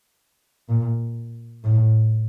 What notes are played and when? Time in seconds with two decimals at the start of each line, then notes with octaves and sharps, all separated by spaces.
0.69 A#2
1.64 A2